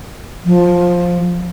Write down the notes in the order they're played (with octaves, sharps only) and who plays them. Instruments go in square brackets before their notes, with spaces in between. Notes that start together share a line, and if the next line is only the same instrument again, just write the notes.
[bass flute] F3